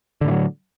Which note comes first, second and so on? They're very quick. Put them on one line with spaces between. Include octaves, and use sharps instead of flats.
D3 A2 E3 F#3